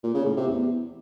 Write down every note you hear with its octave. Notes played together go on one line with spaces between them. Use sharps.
A#2
C#3
A2
C3
E2